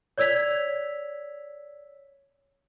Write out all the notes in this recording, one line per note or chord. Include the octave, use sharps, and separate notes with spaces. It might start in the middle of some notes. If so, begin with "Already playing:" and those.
C#5 D5 E6 G#6 B6 F7